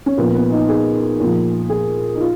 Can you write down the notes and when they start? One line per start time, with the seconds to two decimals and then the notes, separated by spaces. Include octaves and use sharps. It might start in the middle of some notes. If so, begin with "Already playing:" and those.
0.06 C#4
0.17 A#2 F3 B3
0.35 B3
0.51 D#4
0.69 G#4
1.20 A#2 F3
1.69 G#4
2.14 D#4
2.21 F4